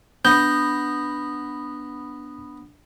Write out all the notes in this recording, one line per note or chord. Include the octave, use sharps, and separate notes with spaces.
B3 D4 G6 A#6